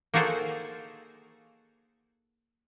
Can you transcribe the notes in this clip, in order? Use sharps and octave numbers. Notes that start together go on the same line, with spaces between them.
A#3 D#4 F#4 G#4 A4 C5